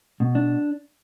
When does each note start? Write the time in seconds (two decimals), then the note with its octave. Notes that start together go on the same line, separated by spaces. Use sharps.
0.20 B2
0.35 D4